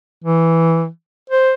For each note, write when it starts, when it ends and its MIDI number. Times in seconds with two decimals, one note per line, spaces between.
0.24 0.88 52
1.30 1.54 72